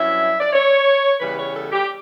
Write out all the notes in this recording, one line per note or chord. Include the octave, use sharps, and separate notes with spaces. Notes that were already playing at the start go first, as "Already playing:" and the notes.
Already playing: G2 F#3 C#4 E4 E5
D5
C#5
C#3 E3 G3 B3 B4
C#5
A4
G4